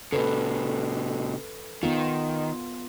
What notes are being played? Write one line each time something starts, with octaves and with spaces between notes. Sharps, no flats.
A#2 C#3 A4 B4
D#3 B3 F4